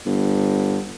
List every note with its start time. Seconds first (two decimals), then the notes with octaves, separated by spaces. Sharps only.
0.06 G1